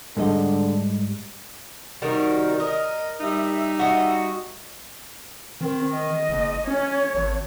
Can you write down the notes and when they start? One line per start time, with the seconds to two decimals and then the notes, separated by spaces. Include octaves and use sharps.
0.17 G#2 D3 G3 D#5
2.02 C3 D#3 G3 D#4 F#4 A#4
2.60 A#4 D#5
3.21 G3 D#4 E5
3.79 F#4 D#5
5.61 D#3 C4
5.95 D#5
6.29 F#1
6.67 C#4 C#5
7.15 G#1